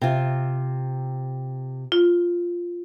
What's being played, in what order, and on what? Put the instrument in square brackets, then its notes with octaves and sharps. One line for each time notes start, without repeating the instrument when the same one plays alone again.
[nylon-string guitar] C3 F4
[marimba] F4